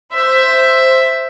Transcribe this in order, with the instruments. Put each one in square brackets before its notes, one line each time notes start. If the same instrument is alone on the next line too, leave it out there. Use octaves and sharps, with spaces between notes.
[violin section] C5 E5